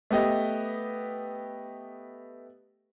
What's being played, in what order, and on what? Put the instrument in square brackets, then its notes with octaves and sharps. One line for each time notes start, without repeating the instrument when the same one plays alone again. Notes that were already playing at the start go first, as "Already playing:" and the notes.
[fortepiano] A3 B3 G4 D#5